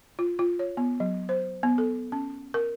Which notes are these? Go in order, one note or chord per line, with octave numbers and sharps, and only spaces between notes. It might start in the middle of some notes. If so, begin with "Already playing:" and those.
F4
F4
C#5
B3
F#3
C5
B3
A4
C#4
A#4